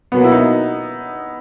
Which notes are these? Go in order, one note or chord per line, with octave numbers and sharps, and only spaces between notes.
B2 F#3 A#3 B3
E4
D#4